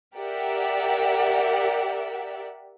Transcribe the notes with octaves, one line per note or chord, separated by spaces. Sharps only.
G4 A#4 D5 E5 F#5